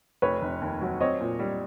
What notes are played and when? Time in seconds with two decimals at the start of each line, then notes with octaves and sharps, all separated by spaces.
0.22 F1 B4 C#5
0.42 F1
0.61 D#2
0.81 F#3
1.00 C4 C#5 D#5
1.21 A#2
1.39 G3